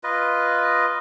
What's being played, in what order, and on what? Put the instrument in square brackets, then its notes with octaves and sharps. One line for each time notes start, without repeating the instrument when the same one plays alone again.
[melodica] F4 B4 D#5